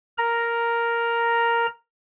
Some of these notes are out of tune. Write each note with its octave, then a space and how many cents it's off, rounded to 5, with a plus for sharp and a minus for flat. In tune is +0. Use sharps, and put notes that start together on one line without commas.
A#4 +0 A#5 +0